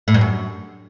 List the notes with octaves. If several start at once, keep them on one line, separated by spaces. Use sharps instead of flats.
A2
G2
F#2